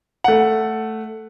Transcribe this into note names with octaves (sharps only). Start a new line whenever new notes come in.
A3 F#5